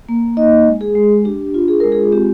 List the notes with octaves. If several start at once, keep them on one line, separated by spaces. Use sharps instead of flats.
A#3
D#4 D#5
G#3
G#4
G#3
D4 G4
F4
G#4
G#3 A#4
G#4
C4 G4